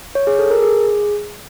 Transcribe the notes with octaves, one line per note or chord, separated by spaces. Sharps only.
C#5
G#4
A4
A#4
G#4